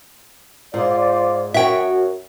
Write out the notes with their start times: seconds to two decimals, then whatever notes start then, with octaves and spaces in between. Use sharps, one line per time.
0.74 G#2 F4 C5 D5
1.54 F#2 F#4 C#5 E5 G5